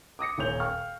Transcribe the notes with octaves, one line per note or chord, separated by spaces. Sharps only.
D6 D#6 A#6 C#7
D#1 A#2 C#5 G6 F7
F5 G5 C#6 F6